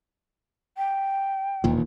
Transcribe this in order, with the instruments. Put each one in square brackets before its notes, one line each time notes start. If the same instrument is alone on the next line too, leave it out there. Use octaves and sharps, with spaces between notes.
[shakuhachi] G5
[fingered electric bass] E1 D#2 A#2